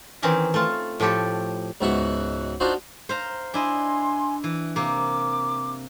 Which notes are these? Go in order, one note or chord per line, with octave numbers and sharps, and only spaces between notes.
D#3 E3 C4 C#4 D#4
A3 F4 A5
A2 F3 A3 G4 A4
C#2 G#2 B2 F#4 E5 F#5
D4 D#4 F4 F#4 C5
C5 F5 A#5
D4 E4 D#5 G#5 C6
E3
C3 A#3 D6